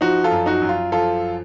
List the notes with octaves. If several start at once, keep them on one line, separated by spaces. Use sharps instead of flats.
F3 D#4 F#4
F4 A4
F#2
D#4 F#4
F#2
F4
F3 F4 A4